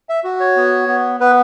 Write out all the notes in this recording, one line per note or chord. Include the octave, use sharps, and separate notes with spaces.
E5
F#4
C#5
B3
B3
B3 B4